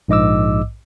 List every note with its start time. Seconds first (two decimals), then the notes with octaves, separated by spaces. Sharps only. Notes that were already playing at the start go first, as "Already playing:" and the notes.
0.08 A#1 G#2 D#5 D6 E6